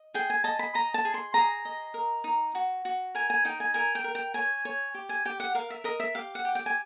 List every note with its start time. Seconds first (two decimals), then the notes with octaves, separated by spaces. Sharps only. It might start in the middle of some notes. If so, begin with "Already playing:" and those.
Already playing: D#5
0.14 G#4 G5
0.30 G#5
0.44 D#5 A5
0.59 B5
0.74 D#5 A#5
0.94 A5
1.05 G#4
1.14 C6
1.34 G#4 A#5
1.65 D#5
1.94 A#4
2.24 D#4
2.55 F#4
2.85 F#4
3.15 A#4 G#5
3.30 G#5
3.45 D#4 G5
3.60 G#5
3.74 A#4 G#5
3.95 G5
4.04 A#4
4.15 G5
4.34 C#5 G#5
4.65 C#5
4.95 G4
5.09 G#5
5.25 G4 G5
5.40 F#5
5.55 A#4 F5
5.70 E5
5.84 A#4 D#5
6.00 E5
6.15 G4 F5
6.35 F#5
6.45 G4
6.55 G5
6.66 G#5